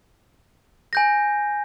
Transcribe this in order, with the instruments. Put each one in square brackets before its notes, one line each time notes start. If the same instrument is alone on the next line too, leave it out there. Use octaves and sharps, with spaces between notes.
[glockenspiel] G#5 G6 A#6